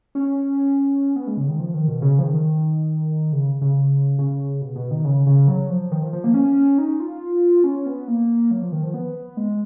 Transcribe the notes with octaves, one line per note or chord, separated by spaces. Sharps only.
C#4
B3
G#3
C#3
D#3
F3
D#3
B2
C#3
F3
D#3
C#3
C#3
C#3
B2
B2
D#3
C#3
C#3
F#3
F3
D#3
F3
F3
A#3
C#4
D#4
F4
C#4
B3
A#3
F#3
F3
D#3
F3
B3
G#3